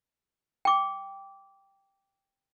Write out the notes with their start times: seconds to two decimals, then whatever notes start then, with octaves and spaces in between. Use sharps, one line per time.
0.65 G5 D6